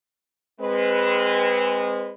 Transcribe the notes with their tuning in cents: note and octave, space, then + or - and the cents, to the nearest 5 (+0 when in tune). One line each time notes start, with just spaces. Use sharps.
G#3 -25 C4 +0 B4 -5